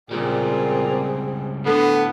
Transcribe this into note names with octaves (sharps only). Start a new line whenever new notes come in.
C#2 A#2 G3 C4 G#4
A2 D3 B3 F#5